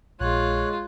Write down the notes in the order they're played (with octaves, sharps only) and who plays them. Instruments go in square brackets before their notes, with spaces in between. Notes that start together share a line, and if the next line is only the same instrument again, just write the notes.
[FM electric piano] A#1 [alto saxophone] G#3 [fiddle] F4 [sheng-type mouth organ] C#5 F#6